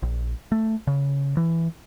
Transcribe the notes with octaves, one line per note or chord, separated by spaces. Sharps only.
A#1
A3
C#3
E3